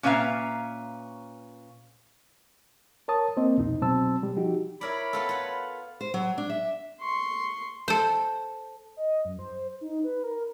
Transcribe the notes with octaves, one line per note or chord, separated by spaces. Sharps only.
A#2 C#4 B4 E5 F5 A#5
A#4 C#5 A5 D#6
A#3 C4 C5 D#5
C2 F2 B2 D#4
B2 F#3 C4 C5 A5 E6
G3
F3 D#4 F#4 G4
E4 A#4 C#5 D5 B5
B3 F4 A4
F4 F#5
C5
F#3
D4
E5
C6 C#6
A4 C5
D#5
F#2
C5
D#4
B4
A#4